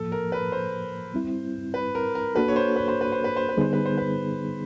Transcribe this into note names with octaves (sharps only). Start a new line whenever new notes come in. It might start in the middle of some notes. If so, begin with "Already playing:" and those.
Already playing: A2 F3 A#3 A4
A#4
B4
C5
G3 C4 E4
B4
A#4
A#4
A#3 D4 F#4 A4 B4
C#5
C5
B4
C5
B4
C5
B4
C5
B4
D3 G3 B3 D#4 G#4 C5
B4
C5
B4